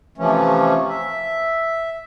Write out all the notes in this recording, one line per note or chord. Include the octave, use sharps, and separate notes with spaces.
C3 E3 F3 A3 C#4
E5